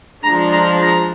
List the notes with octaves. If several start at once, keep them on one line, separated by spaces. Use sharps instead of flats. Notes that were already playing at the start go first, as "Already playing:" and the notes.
F3 G#3 D4 A#5
A#5
A#5